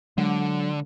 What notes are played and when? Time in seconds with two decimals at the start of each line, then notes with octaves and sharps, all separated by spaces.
0.18 D3 F#3 G#3